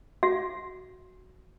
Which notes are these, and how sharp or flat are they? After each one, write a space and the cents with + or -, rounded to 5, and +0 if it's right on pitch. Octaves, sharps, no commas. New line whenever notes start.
F#4 +0 E5 +40